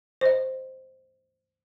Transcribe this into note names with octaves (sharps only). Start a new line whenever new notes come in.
C5 D#5